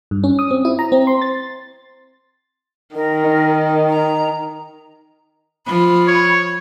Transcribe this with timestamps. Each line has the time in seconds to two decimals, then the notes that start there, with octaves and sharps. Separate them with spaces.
0.11 G2
0.24 C#4
0.39 D#6
0.51 C4
0.65 E4
0.79 A#5
0.92 C4
1.07 C6
1.22 A6
2.96 D#3 A#4
3.89 A#5
5.67 F3 B5
6.07 C#5